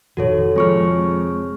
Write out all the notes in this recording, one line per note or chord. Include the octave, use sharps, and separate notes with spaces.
F1 A#2 D#3 F#4 A4 C#5
F2 G#3 G#4 C#5 C#6 F6